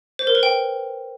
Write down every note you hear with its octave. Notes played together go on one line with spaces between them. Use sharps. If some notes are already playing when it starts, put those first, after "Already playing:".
C5
A#4
B4
G5